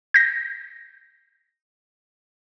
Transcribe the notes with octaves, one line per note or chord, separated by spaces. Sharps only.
G6 A#6